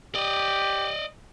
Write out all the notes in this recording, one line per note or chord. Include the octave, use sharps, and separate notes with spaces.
G4 D5 D#5